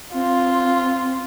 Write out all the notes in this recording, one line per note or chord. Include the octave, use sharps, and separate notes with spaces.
C4 F4